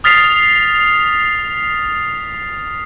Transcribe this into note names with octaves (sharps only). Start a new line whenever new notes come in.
D#6 F6 A6 B6 C7 F7